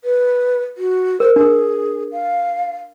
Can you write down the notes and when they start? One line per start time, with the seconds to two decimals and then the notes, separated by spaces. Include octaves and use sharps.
0.04 B4
0.78 F#4
1.20 A#4 C5
1.36 D4 G#4 A#4
2.12 F5